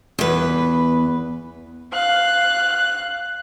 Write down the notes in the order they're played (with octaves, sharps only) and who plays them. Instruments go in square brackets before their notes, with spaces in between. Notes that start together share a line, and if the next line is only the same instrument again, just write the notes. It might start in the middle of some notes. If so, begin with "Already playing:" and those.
[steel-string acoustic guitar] E2 B4
[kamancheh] F5 F#6